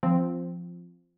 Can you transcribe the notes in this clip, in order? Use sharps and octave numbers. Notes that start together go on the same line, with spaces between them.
F3 C4